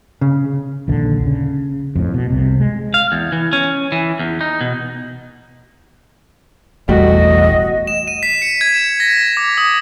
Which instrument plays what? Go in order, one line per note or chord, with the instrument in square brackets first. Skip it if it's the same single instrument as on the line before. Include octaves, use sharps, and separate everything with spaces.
[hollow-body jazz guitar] C#3
[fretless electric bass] A#1 D#2 D3
C#3
F2 A2
B2
C2 C3
G#3
[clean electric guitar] F5
E2
E3
C#4
E3
E2
D#4
B2
[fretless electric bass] E1 A1 A3 [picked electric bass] E2 G3 [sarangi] F#4 [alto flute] D#5
[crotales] E7
D#7
B6
C#7
G#6
E7
A#6
D6
D#6